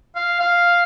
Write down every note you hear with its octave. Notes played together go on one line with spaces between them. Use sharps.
F5
F5